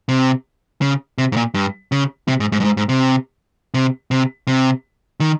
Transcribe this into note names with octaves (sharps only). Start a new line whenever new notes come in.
C3
C#3
C3
G#2
A#2
G2
C#3
C3
G#2
G#2
G2
G#2
G#2
C3
C3
C3
C3
D#3